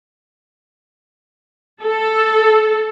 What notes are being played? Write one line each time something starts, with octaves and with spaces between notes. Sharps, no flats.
A4